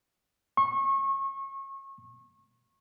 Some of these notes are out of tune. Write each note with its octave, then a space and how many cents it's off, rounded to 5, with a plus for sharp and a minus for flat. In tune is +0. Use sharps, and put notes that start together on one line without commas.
C#6 -30